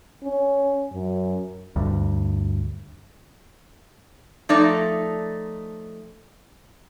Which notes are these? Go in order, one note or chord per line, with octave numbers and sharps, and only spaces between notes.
C#4
F#2
D2 G2
F3 A3 D#4 D5